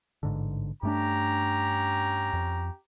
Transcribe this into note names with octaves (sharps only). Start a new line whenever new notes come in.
A1 G#2 D3
G2 A3 C#4 D4 G4 A#5
F2